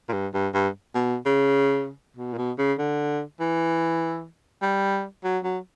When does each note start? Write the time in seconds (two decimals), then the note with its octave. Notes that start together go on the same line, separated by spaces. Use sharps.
0.09 A#2
0.13 G2
0.34 G2
0.54 G2
0.95 B2
1.26 C#3
2.17 B2
2.34 A#2
2.38 B2
2.59 C#3
2.79 D3
3.40 E3
4.62 G3
5.24 F#3
5.44 F#3